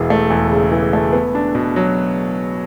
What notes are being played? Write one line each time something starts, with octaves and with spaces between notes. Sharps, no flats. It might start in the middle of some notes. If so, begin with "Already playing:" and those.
Already playing: E1 E3
A3
E2
C#3
E3
A3
B3
D4
B2
F#3